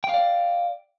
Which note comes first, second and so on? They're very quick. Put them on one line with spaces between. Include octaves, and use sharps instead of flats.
G5 F5 D5